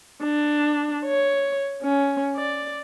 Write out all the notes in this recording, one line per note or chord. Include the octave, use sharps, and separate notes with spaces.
D4
C#5
C#4
D5